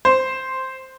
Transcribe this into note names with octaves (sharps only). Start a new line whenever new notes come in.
C5